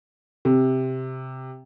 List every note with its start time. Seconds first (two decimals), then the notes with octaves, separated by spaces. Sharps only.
0.45 C3